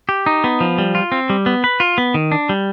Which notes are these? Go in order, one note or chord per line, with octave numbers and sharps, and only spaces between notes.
G4
D#4
B3
F3
G3
F4
C4
G3
B3
B4
F4
B3
D#3
D4
G3